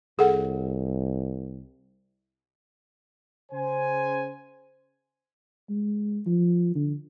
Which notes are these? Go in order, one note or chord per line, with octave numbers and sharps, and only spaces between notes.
C2 G#4 A4 F#5
C#3 C5 G#5
G#3
F3
D3